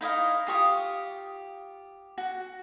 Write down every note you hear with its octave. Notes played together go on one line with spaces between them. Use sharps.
D#4 E4 D#5 F5
F4 G4 C#6 D#6
F#4